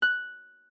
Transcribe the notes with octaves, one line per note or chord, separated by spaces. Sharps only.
F#6